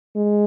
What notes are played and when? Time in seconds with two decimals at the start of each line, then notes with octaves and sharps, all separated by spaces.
0.16 G#3